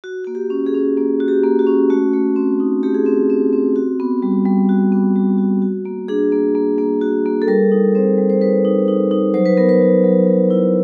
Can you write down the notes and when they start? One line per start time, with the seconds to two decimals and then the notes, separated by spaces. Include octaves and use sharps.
0.04 F#4
0.25 A#3 F#4
0.35 G4
0.50 C#4
0.66 G#4
0.74 C#4
0.97 A#3
1.20 F#4
1.28 G4
1.44 A#3
1.59 F#4
1.67 C#4
1.90 A3 F#4
2.13 A3
2.36 C4
2.60 D#4
2.83 A3 G4
2.95 G#4
3.05 C4 G4
3.30 C4
3.53 C4
3.76 F#4
4.00 B3
4.22 G3
4.46 G3
4.69 F#4
4.92 B3
5.16 G3
5.38 F#4
5.62 F#4
5.85 A#3
6.08 D4 G#4
6.32 A#3
6.55 A#3
6.78 A#3
7.01 F#4
7.25 A#3
7.42 A4
7.48 G3 A#4
7.72 D#4
7.95 C4 C5
8.18 G3
8.30 C5
8.41 D#4 B4
8.65 D#4
8.88 D#4
9.11 D#4
9.34 F#3 C5
9.46 B4
9.57 B3 A#4
9.69 B4
9.81 F#3
10.04 F#3
10.27 F#3
10.50 E4